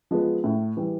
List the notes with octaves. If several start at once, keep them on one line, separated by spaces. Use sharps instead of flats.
F3 G#3 B3
A2
E3 G3